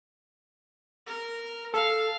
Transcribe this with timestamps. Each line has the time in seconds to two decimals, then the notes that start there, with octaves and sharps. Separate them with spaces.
1.06 A#4
1.74 A4 F5